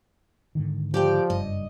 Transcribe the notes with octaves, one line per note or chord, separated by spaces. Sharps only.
G#2 D3 D#3
F3 G4 D5 G5
F#1 G2 D#5